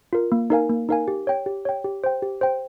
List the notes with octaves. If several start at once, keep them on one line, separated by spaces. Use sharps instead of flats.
F4 A#4
A#3
D#4 A#4 F5 G#5
A#3
D#4 A#4 F5 G#5
G4
C#5 G5
G4
C#5 G5
G4
C5 G5
G4
C5 G5